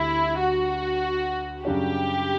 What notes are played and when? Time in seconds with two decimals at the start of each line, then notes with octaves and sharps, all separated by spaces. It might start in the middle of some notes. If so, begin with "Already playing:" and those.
Already playing: D2 D3 G3 E4
0.40 F#4
1.65 F#2 C#3 G3 D4 G4